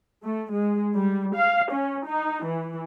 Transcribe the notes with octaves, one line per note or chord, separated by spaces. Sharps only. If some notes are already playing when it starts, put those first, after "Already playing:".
A3
G#3
G3
F5
C#4
D#4
E3